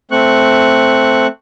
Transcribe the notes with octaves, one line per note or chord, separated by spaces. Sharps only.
A3 C4 C#6 F#6